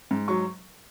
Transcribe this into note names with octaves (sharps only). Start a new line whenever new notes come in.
G#2
F#3 C#6